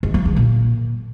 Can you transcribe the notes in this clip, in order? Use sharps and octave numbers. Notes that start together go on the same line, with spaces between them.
G#3
F3
D3
A#2